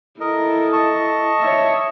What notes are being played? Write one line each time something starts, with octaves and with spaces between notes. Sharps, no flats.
E4 A4 A#4 D#5
D#5 A5 C#6
C#5 E5